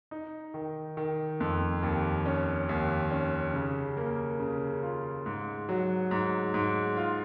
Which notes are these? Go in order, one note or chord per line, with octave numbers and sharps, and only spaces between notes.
D#4
D#3
D#3
F2
D#2
C#4
D#2
C#4
C#3
A#3
C#3
F4
G#2
F#3
G#2
G#2
F4